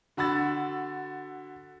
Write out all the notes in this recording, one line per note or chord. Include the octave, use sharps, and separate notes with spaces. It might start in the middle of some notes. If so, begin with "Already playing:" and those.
D3 F#4 B5 E6 A6